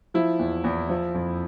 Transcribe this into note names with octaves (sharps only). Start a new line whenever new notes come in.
F3 E4
E2
E2
F3
F2